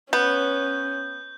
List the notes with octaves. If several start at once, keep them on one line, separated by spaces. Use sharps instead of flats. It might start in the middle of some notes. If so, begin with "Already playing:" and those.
B3 C#4 G6